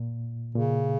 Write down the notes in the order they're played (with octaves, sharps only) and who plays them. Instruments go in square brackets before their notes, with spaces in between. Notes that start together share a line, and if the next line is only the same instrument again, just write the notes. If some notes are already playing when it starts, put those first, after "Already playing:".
Already playing: [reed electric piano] A#2
[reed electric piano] A#2 [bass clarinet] C#3